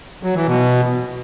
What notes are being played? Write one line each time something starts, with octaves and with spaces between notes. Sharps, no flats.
F#3
E3
B2